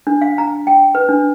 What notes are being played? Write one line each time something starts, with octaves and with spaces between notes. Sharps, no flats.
D4
F5
A#5
G5
B4
D4